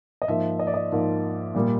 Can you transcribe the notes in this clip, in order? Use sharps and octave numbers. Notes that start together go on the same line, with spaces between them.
D#5
G#2 F3 A#3 E5
D#5
D5
D#5
G#2 F3 A#3
A#2 G3 A#3